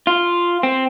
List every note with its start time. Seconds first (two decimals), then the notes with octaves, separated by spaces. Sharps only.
0.07 F4
0.63 C4